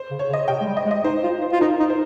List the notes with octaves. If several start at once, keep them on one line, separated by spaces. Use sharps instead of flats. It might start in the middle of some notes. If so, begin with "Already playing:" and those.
Already playing: C5
C#3
C#5
C#3
D#5
C3 G5
G#3
G3
D#5
G#3
D#5
D#4 C5
F4
C5
F4
D#4 A#4
D#4
C5